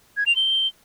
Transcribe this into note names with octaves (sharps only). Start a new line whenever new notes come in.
G#6
F7
G7